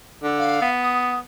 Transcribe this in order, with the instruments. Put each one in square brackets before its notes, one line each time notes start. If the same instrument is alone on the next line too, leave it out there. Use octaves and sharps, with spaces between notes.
[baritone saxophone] D3
[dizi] F5
[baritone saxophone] B3
[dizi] D#6